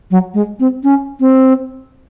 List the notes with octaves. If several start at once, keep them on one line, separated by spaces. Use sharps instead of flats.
F#3
G#3
C4
C#4
C4